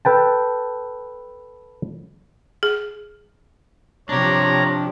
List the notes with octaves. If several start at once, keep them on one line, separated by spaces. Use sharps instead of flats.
A4 B4 G5 A5
G#4
C3 F3 D4 G4 C#5 A#5